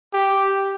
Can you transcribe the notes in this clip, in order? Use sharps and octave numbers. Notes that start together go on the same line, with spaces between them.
G4